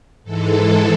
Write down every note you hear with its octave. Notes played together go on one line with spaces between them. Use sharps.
G#2 E3 G#3 A4